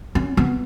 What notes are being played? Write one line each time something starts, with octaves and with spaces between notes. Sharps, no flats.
C#4
B3